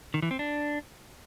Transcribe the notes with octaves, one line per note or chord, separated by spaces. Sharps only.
D#3
E3
C4
D4